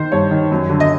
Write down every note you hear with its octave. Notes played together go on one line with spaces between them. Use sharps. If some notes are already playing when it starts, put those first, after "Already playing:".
Already playing: D#3 C5
G2 C#5
D#3
F#2
D3
D#5